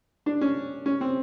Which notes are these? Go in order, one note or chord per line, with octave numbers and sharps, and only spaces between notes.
D4
C#4
C#4
C4